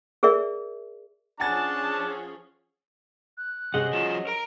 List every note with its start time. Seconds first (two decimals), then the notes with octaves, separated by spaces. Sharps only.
0.23 G#4 A#4 D5 E5
1.40 F3 C#4 D4 G#4 F#5 G#5 A5 A6
3.37 F#6
3.74 C3 C#4 G#4 C5 C#5 D#5 F#5
3.93 F#3 F4 E7
4.27 A#4 A#5 D7